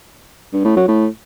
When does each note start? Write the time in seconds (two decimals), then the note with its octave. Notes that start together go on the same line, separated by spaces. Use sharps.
0.53 G2
0.65 A2
0.76 F#3
0.88 A2